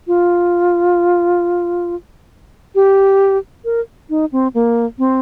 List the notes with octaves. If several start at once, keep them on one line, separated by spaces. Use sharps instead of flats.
F4
G4
A#4
D#4
C4
A#3
C4